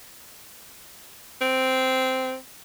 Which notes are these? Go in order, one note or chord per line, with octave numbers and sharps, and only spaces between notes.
C4